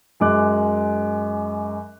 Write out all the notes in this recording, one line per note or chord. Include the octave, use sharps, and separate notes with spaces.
F#2 G#3 D6 F#6